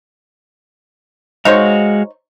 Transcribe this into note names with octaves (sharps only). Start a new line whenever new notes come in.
G#3 D#4 F#4 C5 C#5 F5